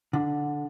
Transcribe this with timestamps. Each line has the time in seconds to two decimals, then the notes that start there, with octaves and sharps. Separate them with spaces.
0.13 D3